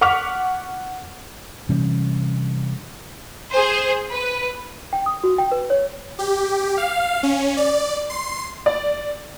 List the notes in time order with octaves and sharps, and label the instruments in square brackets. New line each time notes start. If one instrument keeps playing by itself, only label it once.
[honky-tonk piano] F#5 C#6 D6 F6 B6 F7
[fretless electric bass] C3 E3 G3 C#4
[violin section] G#4 C5
B4
[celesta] G5
D#6
F#4
G5
B4
C#5
[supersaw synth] G4
F5
C#4
D5
C6
[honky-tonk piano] D5